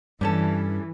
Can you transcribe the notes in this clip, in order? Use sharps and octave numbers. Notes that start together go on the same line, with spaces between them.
G2 E3 G3 C#4 A4